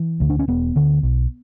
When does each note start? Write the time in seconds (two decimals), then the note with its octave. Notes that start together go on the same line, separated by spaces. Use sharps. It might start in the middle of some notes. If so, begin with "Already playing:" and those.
Already playing: E3
0.20 D2 D3
0.30 D4
0.39 C#4
0.48 E1 B3
0.76 D2 D3
1.03 B1